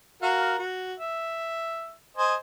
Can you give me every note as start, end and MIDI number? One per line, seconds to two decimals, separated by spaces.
0.22 0.58 66
0.22 0.58 70
0.22 0.58 77
0.59 0.94 66
0.99 1.93 76
2.17 2.35 72
2.17 2.35 75
2.17 2.35 80